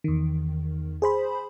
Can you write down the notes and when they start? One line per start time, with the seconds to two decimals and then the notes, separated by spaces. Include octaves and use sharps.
0.04 E2 D#3
1.02 G#4 C5 B5